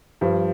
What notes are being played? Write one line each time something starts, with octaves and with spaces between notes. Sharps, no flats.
G2 F3